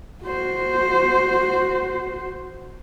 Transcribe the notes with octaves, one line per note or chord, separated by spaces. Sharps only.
F#4 C5